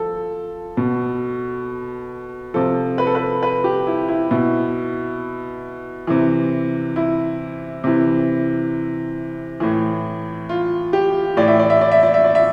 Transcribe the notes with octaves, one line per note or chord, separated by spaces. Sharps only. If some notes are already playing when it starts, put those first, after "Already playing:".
Already playing: F3 A4
B2
C3 F3 A4
B4
A4
B4
B4
G4
E4
E4
B2 E4
C3 E3
E4
C3 E3
A2 E3
F4
G4
A2 E3 D5
E5
D5
E5
D5
E5
D5
E5
D5
E5